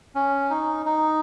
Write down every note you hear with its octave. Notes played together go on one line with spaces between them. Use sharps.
C#4
D#4
D#4